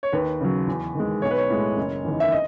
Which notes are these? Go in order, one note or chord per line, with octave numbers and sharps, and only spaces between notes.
C#5
D#2 B4
C#3 F#3
E2
D#3 G#3
B1 C#5
B4
C#5
A2 G#3
F#1
E2 D#3
E5
D#5